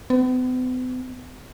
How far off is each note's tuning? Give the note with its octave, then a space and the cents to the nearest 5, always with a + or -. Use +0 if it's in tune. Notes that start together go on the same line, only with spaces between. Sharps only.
B3 +45